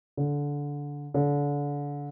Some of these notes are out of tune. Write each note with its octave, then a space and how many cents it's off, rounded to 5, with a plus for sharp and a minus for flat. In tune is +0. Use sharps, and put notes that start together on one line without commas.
D3 -20
D3 -30